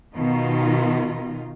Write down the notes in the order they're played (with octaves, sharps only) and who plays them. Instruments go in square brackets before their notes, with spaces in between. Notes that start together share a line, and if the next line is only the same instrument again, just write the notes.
[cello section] B2 D#3 D#4 F4